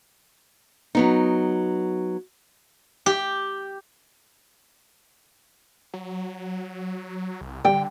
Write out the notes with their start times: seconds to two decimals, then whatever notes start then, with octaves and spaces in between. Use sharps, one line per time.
0.95 F#3 B3 D#4
3.06 G4
5.93 F#3
7.41 C2
7.65 D3 G3 G5